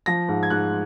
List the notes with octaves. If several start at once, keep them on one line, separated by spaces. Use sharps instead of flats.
F3 A#6
G#2
G#6
G#2 F#6